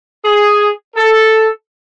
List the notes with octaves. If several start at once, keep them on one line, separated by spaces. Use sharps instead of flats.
G#4
A4